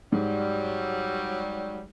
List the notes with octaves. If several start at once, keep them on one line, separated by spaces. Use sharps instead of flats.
G#2 F#3 G3